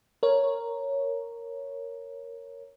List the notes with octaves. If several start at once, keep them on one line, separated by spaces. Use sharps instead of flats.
A#4 C#5